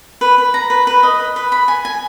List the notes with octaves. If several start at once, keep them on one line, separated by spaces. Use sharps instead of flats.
B4
B4
A#5
B4
B4
D#5
B4
B4
B5
G#5
G#5